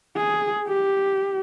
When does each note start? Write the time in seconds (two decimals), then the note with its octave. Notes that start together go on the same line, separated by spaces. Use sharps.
0.17 G#4
0.67 G4